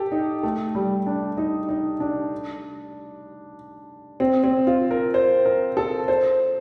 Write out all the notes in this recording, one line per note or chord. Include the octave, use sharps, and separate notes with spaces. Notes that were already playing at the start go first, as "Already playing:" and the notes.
Already playing: G4 A4
D#4
A3
G3
D4
D#4
D#4
D4
C4
C4
F4
A#4
C5
A#4
A4
C5